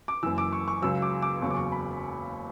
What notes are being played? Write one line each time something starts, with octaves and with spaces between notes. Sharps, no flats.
D6
F#1 F#2 E3 E6
D6
C#6
C#6
C#2 C#3 F#3 E6
D6
D6
F#1 E2 C#3 F#3 C#6
D6
C#6
B5